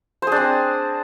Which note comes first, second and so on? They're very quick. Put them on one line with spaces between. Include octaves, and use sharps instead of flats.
C5 G#4 D4 C4